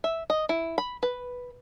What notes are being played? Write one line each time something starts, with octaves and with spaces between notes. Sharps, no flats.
E5
D#5
E4
B5
B4